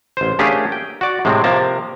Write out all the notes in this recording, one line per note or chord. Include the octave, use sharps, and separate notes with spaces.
A1 C5
A3 A#3 C#4 D4 G4 G#4
G5
F#4 D5
A2 C3 G#3 C4
C3 F3 A#3 A#4 A5